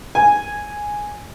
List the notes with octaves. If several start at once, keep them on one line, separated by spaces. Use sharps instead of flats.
G#5